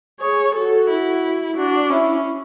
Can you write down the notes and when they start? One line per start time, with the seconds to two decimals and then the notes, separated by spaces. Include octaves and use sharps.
0.20 G#4 C#5
0.55 F#4 A4
0.89 E4
1.56 D4 F#4
1.90 C#4 E4